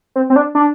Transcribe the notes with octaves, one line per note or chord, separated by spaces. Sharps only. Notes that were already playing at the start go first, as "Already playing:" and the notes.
C4
C4
D4
D4